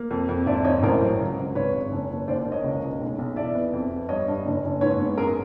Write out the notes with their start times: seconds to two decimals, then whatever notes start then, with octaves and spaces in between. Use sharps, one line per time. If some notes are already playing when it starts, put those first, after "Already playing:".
Already playing: A#3
0.11 F2
0.29 F2
0.46 G#1 D5 E5
0.64 G#1 C#5 D#5
0.83 A1 A#4 C5
1.02 F#3
1.19 C#2
1.38 C#2
1.55 G#1 B4 C#5
1.73 G#1
1.91 F#1
2.10 F#1
2.28 D#2 C5 D5
2.46 A#3
2.52 C#5 D#5
2.64 C#2
2.83 C#2
3.01 B1
3.18 B1
3.36 E2 D5 E5
3.55 B3
3.73 F2
3.91 B3
4.09 G2 C#5 D#5
4.28 G2
4.46 F#1
4.64 F#1
4.81 G#2 B4 C#5
4.99 B3
5.18 F#2 G#4 A#4